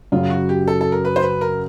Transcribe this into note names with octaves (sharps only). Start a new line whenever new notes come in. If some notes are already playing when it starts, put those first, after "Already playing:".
F#2 C#3 F#3 F4
F#4
G4
A4
A4
A#4
B4
C5
B4
A#4